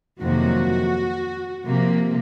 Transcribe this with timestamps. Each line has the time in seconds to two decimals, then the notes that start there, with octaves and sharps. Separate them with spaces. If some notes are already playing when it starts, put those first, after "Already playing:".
0.21 F2 C3 D#3 F#3 A#3 F#4
1.66 C3 F3 A#3